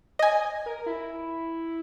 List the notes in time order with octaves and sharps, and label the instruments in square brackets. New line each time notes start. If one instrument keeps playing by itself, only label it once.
[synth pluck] D#5 G#5
[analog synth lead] A#4
E4